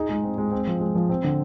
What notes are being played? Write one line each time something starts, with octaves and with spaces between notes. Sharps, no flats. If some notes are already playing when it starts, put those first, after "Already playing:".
Already playing: D#4 G#4
G#3
C4
G#3
C4
F3
G#3
F3
C4
D3